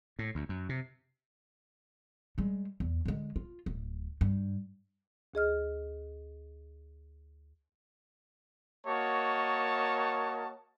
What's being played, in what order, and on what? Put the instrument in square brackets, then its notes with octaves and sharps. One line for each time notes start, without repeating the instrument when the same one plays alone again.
[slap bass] A2
D2
F#2
C3
[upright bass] G3 G#3
E2
D3 G#3
F4
D1
G2
[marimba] D2 G#4 D#5 F6
[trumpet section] A#3 F#4 A#4 C#5 D#5 A5